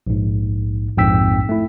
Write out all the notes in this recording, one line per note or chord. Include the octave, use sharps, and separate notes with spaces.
A#1 G#2
A#1 F2 G#2 G5 E6 B6
A3 E4